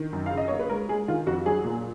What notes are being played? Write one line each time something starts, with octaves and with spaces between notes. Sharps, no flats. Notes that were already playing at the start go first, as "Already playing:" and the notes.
Already playing: D#3
F#2
C#3 F5
D#5
A#3 C#5
B4
G#3 A#4
G#3 G#4
D#3 F4
F2 F#4
F#3 G#4
A#2